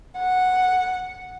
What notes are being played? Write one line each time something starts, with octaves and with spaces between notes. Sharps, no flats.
F#5